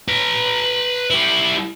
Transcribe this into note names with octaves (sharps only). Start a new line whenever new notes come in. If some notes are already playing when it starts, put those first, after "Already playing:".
B4 A#5
G3 E4